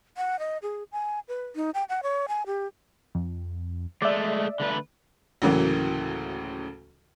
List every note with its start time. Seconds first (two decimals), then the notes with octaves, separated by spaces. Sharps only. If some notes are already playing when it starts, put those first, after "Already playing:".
0.17 F#5
0.39 D#5
0.63 G#4
0.92 G#5
1.28 B4
1.56 D#4
1.74 G5
1.89 F#5
2.03 C#5
2.28 G#5
2.46 G4
3.15 F2
4.02 G#3 A3 D5 E5
4.60 D3 A3 B4
5.42 D2 A2 C#3 E3 F#3 A#3